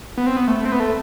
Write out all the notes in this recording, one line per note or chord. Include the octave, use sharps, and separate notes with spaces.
B3
C4
B3
A3
C4
B3
A3